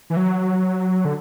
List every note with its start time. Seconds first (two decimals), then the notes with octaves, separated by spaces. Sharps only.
0.10 E3
0.17 F#3
1.05 D3